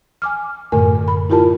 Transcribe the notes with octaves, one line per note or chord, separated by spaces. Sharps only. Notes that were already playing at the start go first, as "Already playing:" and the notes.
G#5 D6 F6
F#2 A2 D3 A3 A#4 G#5
B5
E4 F4 G4 A#4 A5